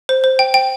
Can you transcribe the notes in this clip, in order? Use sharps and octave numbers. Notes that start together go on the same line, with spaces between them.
C5
C5
G5
G5